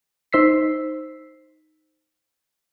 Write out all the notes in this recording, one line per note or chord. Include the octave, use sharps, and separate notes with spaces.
D#4 C5 E6 B6 C7